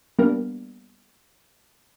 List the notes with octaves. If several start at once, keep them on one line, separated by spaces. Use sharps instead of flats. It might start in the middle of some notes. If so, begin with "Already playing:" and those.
G3 A#3 B3 D4 A#4